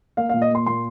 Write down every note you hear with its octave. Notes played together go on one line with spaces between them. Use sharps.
A#3 F5
F5
A#2
D#5
A#3 C6
A#2 C6